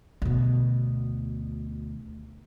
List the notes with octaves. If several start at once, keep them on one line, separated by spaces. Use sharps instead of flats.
D2 B2